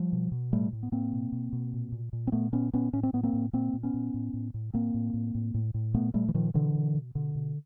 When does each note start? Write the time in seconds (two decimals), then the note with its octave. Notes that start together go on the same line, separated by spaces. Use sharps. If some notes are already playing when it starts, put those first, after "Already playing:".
Already playing: F3 G3
0.13 B2
0.32 B2
0.52 A2 G3 A3
0.73 A2
0.83 B3
0.92 A2 A#3 C4
1.12 B2
1.32 B2
1.53 B2
1.73 A#2
1.92 A#2
2.13 A#2
2.27 C4
2.32 A#2 A3 B3
2.52 A#2 B3 C#4
2.73 A#2 B3 C#4
2.93 A2 C#4
3.03 C4
3.13 A2 B3
3.23 A#3 C4
3.33 A2
3.53 A#2 A#3 C4
3.73 A#2
3.83 B3 C#4
3.94 A#2
4.14 A2
4.33 A2
4.54 A2
4.74 A2 A#3 C4
4.94 A2
5.14 A2
5.35 A2
5.54 A2
5.74 A2
5.94 A#2 A3 B3
6.14 A#2 G3 A3
6.29 E3
6.34 A#2 D#3 F3
6.54 B2 D3 E3
6.75 B2
6.95 B2
7.15 B2 D3
7.35 B2